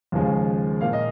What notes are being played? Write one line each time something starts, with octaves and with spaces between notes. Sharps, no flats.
D#2 C#3 F3 G#3
A#2 A#3 F5
D#5